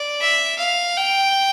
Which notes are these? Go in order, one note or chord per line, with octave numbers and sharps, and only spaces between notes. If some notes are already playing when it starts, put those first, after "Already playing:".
Already playing: D5
E5
F5
G5